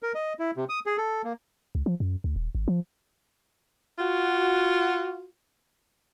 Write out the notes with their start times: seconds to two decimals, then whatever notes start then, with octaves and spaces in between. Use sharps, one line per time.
0.03 A#4
0.15 D#5
0.39 E4
0.57 C3
0.69 D#6
0.86 G#4
0.98 A4
1.24 A#3
1.75 C#2
1.86 F3
2.00 F#2
2.24 D2
2.36 D#1
2.55 G#1
2.68 F3
3.99 F4 F#4